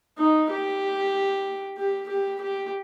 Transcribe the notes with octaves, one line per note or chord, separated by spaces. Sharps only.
D#4
G4
G4
G4
G4